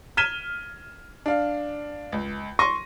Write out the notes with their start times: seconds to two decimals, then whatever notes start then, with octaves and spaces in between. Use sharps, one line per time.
0.17 F6 G#6 B6 D#7 E7 G7
1.26 D4 F5
2.12 C#2
2.59 C6 C#6 A#6 D#7